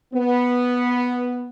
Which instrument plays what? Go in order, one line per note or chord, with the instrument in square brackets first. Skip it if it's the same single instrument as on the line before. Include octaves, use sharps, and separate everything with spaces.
[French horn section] B3